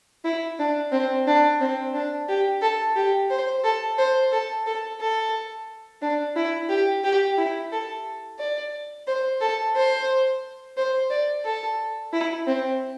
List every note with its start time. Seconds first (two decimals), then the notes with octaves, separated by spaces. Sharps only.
0.25 E4
0.59 D4
0.92 C4
1.27 D4
1.61 C4
1.94 D4
2.28 G4
2.62 A4
2.96 G4
3.30 C5
3.64 A4
3.98 C5
4.32 A4
4.66 A4
5.00 A4
6.02 D4
6.36 E4
6.69 G4
7.04 G4
7.38 E4
7.72 A4
8.39 D5
9.07 C5
9.41 A4
9.76 C5
10.77 C5
11.10 D5
11.45 A4
12.13 E4
12.47 C4